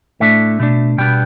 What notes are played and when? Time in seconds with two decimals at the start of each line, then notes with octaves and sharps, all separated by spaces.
0.20 A2 A3 D4 E5
0.60 B2 A3 D4
0.98 B2 G3 B3 D4 G5